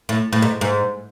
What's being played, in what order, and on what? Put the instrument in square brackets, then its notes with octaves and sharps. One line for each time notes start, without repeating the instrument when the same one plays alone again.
[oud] A2
A2
G#2
G#2